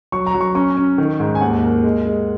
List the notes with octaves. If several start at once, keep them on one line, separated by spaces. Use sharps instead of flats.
F#3 C#6
A#5
F#3
C#6
C#4 C#6
C#4
D#3
G#2
G#5
D#2 F#5
A#3
G#3
G#3